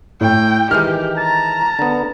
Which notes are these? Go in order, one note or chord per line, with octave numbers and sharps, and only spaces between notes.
A2 G5
D#3 E3 G#3 G4 F6
A5 A#5
D3 B3